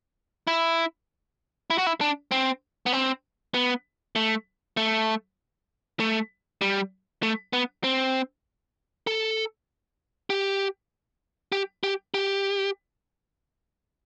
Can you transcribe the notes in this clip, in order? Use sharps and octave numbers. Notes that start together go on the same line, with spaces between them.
E4
E4
F#4
E4
D4
C4
B3
C4
B3
A3
A3
A3
G3
A3
B3
C4
A4
G4
G4
G4
G4